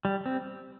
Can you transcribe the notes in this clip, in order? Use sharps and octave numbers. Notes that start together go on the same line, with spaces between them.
G3
C4